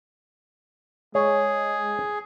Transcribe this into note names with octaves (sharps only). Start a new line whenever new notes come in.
G#3 G#4 C#5